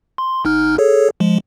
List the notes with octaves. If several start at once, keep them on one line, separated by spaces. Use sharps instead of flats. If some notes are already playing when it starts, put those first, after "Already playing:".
C6
G1 D#4 F6
G#4 A4 C#5
F3 G#3